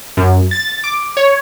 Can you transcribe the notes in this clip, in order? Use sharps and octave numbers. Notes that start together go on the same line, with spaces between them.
F#2
A6
D6
C#5